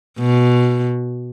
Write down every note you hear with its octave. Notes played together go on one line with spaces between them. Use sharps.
B2